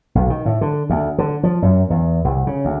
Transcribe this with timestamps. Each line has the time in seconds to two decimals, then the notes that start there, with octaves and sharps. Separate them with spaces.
0.15 B1
0.30 D#3
0.46 A2
0.61 D3
0.90 D2
1.18 D3
1.43 F3
1.62 F#2
1.90 E2
2.24 C2
2.47 C#3
2.65 D2